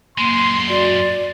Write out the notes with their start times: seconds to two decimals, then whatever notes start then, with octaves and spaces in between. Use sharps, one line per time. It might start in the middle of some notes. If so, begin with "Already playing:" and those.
0.18 F#2 G#3 A#3 C6
0.68 F#4 D5